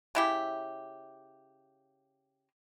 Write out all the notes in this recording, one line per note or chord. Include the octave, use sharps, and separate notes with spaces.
C#3 E4 G4